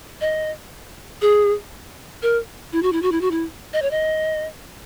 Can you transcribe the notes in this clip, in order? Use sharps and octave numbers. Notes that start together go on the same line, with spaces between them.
D#5
G#4
A#4
E4
F#4
E4
F#4
E4
F#4
E4
D#5
C#5
D#5